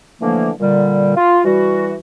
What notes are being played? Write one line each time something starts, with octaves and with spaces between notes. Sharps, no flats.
D3 E3 F3 A3 A#3
A#2 D3 G3
F4
E3 G3 F#4